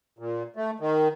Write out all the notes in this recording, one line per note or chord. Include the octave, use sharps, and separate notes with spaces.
A#2
A3
D#3